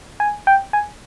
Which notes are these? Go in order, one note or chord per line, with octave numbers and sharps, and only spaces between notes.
G#5
G5
G#5